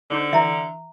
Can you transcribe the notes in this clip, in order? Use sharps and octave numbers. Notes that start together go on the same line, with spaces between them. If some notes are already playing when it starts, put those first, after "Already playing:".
D3 D4 D#4 C5
E3 E5 A#5